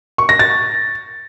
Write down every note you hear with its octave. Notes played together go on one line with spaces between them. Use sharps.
C#6
A#6
A6